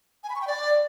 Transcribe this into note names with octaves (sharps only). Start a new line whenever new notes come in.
G#5
B5
C#6
G5
D5